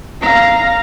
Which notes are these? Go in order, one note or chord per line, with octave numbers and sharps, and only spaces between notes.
F5 A#5